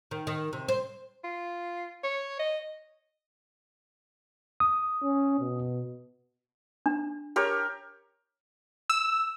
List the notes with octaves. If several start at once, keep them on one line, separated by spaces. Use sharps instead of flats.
D#3
D#3
C3
C5
F4
C#5
D#5
D#6
C#4
B2
D4
G4 A#4 C#5
E6